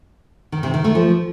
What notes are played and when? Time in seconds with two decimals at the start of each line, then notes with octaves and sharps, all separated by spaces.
0.52 D#3
0.63 C3
0.74 D#3
0.84 A3
0.95 F3